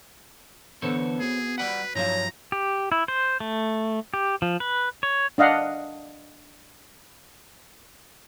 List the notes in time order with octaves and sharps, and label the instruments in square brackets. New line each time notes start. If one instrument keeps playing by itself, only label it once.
[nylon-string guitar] D3 E3 [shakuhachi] B3 [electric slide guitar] A4 C5 C#5
[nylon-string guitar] C4 F#4 [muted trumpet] G#4
[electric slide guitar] G3 D5 F#5 [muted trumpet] B4
[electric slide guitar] G2 F3 F#3 [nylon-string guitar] E4 F5 [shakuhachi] C#5 [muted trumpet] A#5
[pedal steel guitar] G4
E4
C5
A3
G4
F3
B4
C#5
[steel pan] D4 D#5 F5 F#5